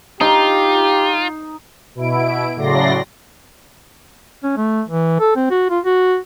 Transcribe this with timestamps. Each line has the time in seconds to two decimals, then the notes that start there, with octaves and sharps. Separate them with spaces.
0.21 D#4 F4 G4
1.95 B2 E4 D7
2.56 A2 C#3 F#3 D5 C6 A#6
4.43 C#4
4.57 A3
4.88 E3
5.20 A4
5.36 C4
5.50 F#4
5.70 F4
5.85 F#4